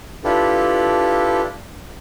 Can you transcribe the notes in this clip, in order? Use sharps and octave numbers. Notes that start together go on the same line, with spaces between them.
D4 E4 F4 G4 A4 B4